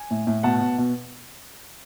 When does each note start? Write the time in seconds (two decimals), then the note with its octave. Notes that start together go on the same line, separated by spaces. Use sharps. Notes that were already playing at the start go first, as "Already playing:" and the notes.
Already playing: G#5
0.11 A2
0.27 A2
0.43 B2 F#5 A5
0.61 B2
0.78 B2